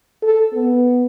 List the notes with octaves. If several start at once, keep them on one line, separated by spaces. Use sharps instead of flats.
A4
B3